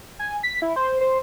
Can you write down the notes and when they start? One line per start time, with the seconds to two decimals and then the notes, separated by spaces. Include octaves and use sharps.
0.19 G#5
0.43 B6
0.62 E4
0.76 C5
1.01 C5